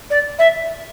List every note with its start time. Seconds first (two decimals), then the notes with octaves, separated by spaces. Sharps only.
0.10 D5
0.39 E5